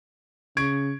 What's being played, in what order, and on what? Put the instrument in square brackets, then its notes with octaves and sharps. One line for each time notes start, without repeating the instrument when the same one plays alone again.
[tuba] C#3 [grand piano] C#6 G#6 D7